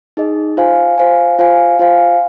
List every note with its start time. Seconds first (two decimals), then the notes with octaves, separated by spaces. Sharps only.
0.17 D#4 G#4 D#5
0.57 F4 C5 F5 G#5
0.98 F4 C5 F5 G#5
1.39 F4 C5 F5 G#5
1.79 F4 C5 F5 G#5